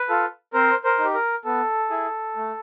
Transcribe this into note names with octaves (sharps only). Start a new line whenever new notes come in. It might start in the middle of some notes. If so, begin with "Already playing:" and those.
Already playing: B4
F4 A4
C4 A#4 C5
A#4 C5
D#4
G4
A#4
B3 A4
E4 G#4
A3